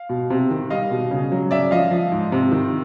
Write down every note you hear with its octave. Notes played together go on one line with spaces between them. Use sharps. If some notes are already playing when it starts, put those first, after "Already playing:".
Already playing: F5
B2
C3
D#3
G3 D#5 F5
B2
C#3
F#3
C#3 D5 E5
F3 D#5 F5
F3
G#2
C3
D#3